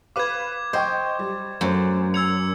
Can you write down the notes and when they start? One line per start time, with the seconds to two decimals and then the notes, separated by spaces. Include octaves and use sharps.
0.16 B4 F5 D6 G#6
0.73 C5 D#5 G5 C#6
1.19 G3
1.61 F#2 A3 C5
2.14 E6 G#6 C#7 F7